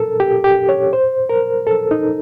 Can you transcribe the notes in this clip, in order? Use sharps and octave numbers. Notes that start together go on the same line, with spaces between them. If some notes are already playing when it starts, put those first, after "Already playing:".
Already playing: A4 A#4
G4
G4
C#5
C5
A#4
A4
D#4